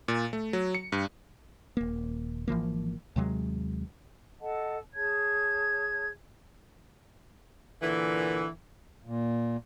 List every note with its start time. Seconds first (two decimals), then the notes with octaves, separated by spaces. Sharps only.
0.08 A#2
0.33 A3
0.53 F#3
0.75 C#7
0.92 G2
1.77 D#1 A#3
2.48 G#1 E3 F3 A#3
3.16 D#2 C3 F#3 G#3
4.40 A4 D#5 F#5 A5
4.93 G#4 C#5 A5 G#6
7.83 A#2 D3 E3
9.05 A#2